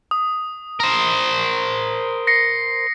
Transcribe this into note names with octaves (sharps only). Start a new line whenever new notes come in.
D#6
A#4 C5
A#6 C7 C#7